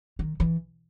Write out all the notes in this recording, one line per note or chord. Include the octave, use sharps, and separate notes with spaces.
D#3
E3